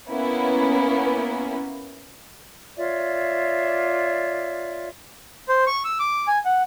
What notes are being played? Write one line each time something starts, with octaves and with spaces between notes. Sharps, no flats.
A#3 B3 C#4 E4
F4 C#5 D5 E5
C5
C#6
E6
D6
G#5
F#5